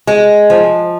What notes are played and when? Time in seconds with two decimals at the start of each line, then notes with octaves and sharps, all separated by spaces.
0.07 G#3
0.50 F3